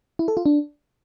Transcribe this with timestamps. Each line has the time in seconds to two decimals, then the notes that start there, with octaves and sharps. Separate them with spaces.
0.19 E4
0.28 A4
0.37 F4
0.46 D4